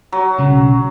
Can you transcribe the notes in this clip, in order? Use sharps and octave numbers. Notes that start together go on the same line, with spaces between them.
F#3
B1 C#3